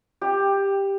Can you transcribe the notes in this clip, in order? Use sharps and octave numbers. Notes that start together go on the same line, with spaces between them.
G4